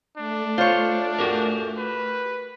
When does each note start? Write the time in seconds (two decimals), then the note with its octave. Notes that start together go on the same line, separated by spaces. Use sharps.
0.17 A3 D4
0.58 F4 C5 C#5
1.19 F#4 G4 A#4
1.77 B4